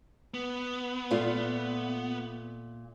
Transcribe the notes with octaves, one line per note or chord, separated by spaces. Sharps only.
B3
A#2 A3 F4